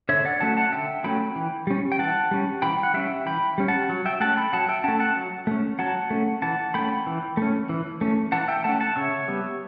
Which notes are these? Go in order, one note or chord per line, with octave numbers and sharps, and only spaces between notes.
D3 C#5 E5
D5 F#5
F#3 A3 C#4 F#5 A5
F#5 A5
D3 E5 G5
F#3 A3 C#4 G5 B5
E3
G3 C#4
G5
E3 F#5 A5
G3 C#4
E3 G5 B5
F#5
G3 C#4 E5 G5
E3 G5 B5
G3 C#4
F#5 A5
F#3
E5 G5
A3 C#4 F#5 A5
G5 B5
F#3 F#5 A5
E5 G5
A3 C#4 F#5 A5
F#5 A5
F#3
A3 C#4
F#3 F#5 A5
A3 C#4
E3 F#5 A5
A3 C#4 G5 B5
E3
A3 C#4
E3
A3 C#4
E3 F#5 A5
E5 G5
A3 C#4 F#5 A5
F#5 A5
C#3 C#5 E5
G3 B3